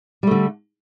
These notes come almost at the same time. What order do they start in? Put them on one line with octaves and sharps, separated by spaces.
G3 A3 D3